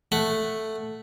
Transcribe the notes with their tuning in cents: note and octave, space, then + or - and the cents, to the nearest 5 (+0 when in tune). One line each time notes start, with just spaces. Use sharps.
A3 +0 F#5 +0